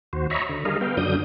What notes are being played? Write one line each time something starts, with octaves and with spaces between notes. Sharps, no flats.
D#2 F#4 C5
C#5 D#5 E5 A#5 B5 C#6
D3
G3 G#4 A#4 D#5 F5
B3 F5 G5
F#2 D3 F#3 D4 D#6 G6